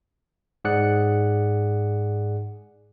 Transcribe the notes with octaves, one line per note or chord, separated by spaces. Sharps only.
G#2 G#4 D5 F#5 F#6 C#7